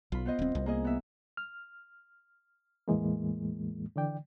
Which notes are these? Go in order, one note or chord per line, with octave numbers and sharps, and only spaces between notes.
B1 F4 B5
B3 C5 D#5
D#1 C4
C2
A#3 G#4 D#5
B3 E5
F6
E2 A2 E3 G#3 A#3
D3 E3 D5 G5